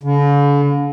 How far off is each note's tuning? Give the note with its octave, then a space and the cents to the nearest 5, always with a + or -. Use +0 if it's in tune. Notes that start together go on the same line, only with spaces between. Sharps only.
D3 -45